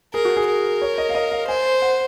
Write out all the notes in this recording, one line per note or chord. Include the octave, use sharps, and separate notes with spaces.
G#4 A#4
F#4
G#4
A#4
C#5
D#5
F5
D#5
F5
C5 G#5
F#5